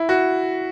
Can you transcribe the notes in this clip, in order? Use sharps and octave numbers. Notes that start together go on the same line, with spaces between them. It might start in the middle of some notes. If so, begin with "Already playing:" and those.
Already playing: E4
F#4